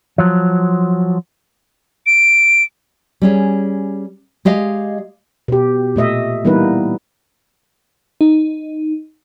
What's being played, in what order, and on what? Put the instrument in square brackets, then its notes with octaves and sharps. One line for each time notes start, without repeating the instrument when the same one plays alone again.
[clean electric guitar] F3 F#3
[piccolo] D7
[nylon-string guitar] G3 C#4 G#4
G#3 G4 D#5 F5
[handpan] B2 G4
A#2 A3 D#5 E5
E3 G3 A#3 B3 D#4 B4
[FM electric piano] D#4